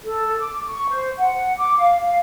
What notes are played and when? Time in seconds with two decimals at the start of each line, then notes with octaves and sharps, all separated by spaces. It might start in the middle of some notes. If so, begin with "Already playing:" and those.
0.03 A4
0.39 D6
0.68 C#6
0.90 C5
1.18 F#5
1.57 D6
1.77 F5
2.03 F5